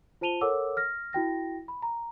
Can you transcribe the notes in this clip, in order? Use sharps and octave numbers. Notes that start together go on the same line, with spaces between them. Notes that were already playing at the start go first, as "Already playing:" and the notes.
F4 C5 A5 D#7 F7 G7
A4 A#4 C#5 F#5 D6 E6
F6 A#6
E4 F#4 G5 A#6
B5
A#5